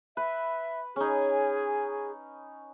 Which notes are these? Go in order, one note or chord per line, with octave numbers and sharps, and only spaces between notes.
B4 E5
C#4 D#4 G#4